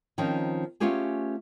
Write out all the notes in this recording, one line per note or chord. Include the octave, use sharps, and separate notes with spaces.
D#3 F3 C4 C#4 D#4
A3 B3 C#4 F4 G4 G#4